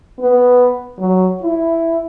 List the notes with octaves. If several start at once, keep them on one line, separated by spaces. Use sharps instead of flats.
B3
F#3
E4